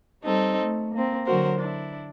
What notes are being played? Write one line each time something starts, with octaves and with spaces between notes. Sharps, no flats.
G3 C4 D#4 A4
A3
A#3 C4
D3 F#3 F#4 A#4 C5
D4 E4